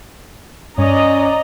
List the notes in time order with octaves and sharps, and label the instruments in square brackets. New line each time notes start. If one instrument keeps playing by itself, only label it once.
[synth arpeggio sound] G2 [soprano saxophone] C#4 [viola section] D5 D#5 A#5